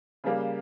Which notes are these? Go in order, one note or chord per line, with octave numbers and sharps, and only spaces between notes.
C#3 G3 A#3